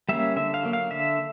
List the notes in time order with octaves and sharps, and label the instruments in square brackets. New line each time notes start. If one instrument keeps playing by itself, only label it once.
[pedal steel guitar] G3 A#3 C#4 E5
D3 E5
F5
F#3 A#3
F5
D3 E5